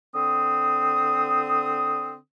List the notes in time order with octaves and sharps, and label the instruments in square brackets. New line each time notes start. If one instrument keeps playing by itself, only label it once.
[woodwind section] D3 C4 D#6